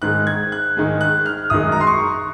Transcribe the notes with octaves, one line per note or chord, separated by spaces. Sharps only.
G#2 D#3 G#3 F#6
G#6
F#6
G#2 D#3 G#3
F#6
F6
F#2 D#3 G#3 D#6
A#5
C6
C#6